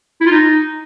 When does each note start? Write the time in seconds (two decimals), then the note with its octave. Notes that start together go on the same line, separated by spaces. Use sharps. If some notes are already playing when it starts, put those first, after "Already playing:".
0.21 E4
0.26 F4
0.31 D#4